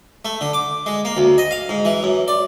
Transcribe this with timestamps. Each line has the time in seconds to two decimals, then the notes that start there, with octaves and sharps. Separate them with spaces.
0.25 A3
0.41 D3
0.53 D6
0.86 G#3
1.05 A#3
1.17 D2
1.38 D#5
1.51 F5
1.69 G#2
1.85 E3
2.03 F#2
2.28 D5